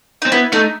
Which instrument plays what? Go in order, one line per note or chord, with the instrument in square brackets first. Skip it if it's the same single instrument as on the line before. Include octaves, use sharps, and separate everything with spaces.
[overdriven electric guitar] C4 [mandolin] D#4
[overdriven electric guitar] B3 [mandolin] E4
[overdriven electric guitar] A3 [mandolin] D#4